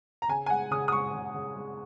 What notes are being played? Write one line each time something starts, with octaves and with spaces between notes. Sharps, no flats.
A#5
C#3 G#5
G#5
G#3 F#5
C#3 D#6
D#6
G#3 C#6
C#3
C#3
G#3